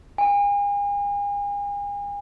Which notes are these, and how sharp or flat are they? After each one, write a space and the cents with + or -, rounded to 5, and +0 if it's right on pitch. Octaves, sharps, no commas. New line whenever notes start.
G#5 -40